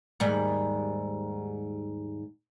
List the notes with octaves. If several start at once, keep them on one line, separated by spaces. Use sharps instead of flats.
D#2 G#2 G3